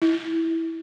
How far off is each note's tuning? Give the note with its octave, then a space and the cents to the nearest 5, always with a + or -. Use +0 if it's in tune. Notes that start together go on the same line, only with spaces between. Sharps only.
E4 -10